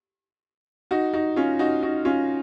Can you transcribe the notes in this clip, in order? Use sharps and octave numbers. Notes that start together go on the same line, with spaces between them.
D#4 F#4
D#4 F#4
C#4 F4
D#4 F#4
D#4 F#4
C#4 F4